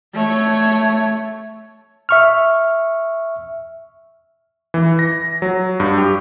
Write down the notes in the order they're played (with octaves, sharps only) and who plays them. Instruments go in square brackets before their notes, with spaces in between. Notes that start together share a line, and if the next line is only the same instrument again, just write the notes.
[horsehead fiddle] A3 C#5
[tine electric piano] E5 C#6 F6
[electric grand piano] E3
A#6
F#3
G2
G4